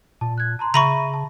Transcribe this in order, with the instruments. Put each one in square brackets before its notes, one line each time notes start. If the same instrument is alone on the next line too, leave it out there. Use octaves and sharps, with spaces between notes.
[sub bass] A#2 [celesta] A5
[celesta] F#6 G#6
A5 A#5 C6
[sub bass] C#3 [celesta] E5 A#6 D#7 [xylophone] A#5 B5 C#6
[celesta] A5